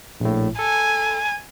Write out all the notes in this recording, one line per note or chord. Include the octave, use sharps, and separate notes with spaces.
A#1 A2
A4 G#5